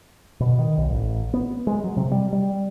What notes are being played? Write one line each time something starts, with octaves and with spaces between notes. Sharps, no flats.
B2
D#3
B1
A1
B3
G#3
F#3
C3
G3
G3